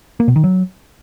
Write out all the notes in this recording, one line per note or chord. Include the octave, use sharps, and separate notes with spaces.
A#3
B2
D#3
F#3